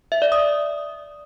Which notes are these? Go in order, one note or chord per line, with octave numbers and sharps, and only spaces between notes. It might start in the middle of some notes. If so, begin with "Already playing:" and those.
E5
D5
D#6